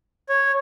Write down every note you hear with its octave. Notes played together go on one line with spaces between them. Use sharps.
C#5